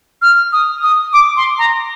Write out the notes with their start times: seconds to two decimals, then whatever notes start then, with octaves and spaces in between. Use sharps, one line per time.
0.22 F6
0.53 D#6
0.83 D#6
1.13 D6
1.37 C6
1.58 A#5